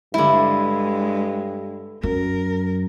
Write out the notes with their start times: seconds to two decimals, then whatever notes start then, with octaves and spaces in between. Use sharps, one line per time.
0.14 G2 D3 G#3 E4
2.03 F#2 A#4